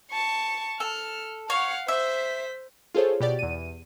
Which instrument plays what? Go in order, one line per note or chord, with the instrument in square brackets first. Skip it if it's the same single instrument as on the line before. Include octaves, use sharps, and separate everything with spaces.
[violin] A5 C#6
[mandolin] A4 [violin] F6
[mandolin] C#5 [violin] F5 F#5
[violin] C5 B6 [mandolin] E5
[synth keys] F4 G#4 A4 C5 C#5
B2 G4 D5 A6
E2 D#7